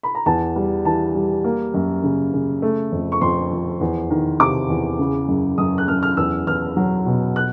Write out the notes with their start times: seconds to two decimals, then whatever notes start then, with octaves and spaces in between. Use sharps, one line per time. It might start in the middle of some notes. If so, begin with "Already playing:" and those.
0.03 B5
0.15 A#5
0.26 E2 A5
0.56 G3
0.85 E3 A5
1.15 G3
1.44 A#3
1.74 F#2
2.03 C#3
2.33 C#3
2.62 A3
2.92 F2
3.12 C#6
3.21 F2 C6
3.52 F3
3.81 E2
4.10 D#3
4.40 C3 D6
4.70 E2
4.99 C#3
5.28 F#2
5.58 F#2 D#6
5.78 F#6
5.88 F#2 F6
6.03 F6
6.17 E2 E6
6.47 E2 F6
6.77 F#3
7.06 B2
7.36 F#6